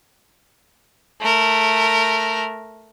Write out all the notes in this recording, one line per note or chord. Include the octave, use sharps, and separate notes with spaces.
A3 A#4